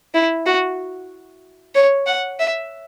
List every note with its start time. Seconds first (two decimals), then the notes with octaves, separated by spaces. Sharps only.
0.14 E4
0.46 F#4
1.75 C#5
2.06 F#5
2.39 E5